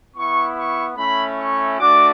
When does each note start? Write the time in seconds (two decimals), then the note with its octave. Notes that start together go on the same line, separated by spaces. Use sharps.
0.15 B3 E4 C#6
0.56 C#6
0.96 A3 C#4 E4 B5
1.38 C#6
1.78 A3 D4 F#4 D6